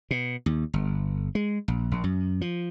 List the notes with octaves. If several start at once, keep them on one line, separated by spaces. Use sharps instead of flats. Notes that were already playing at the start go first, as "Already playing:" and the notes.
B2
D#2
G1
G#3
A#1
A#1
F#2
F3